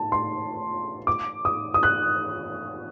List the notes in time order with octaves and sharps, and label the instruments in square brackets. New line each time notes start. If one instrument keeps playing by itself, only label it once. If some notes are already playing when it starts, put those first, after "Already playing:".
Already playing: [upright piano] A5
C6
D6
D#6
D#6
F#6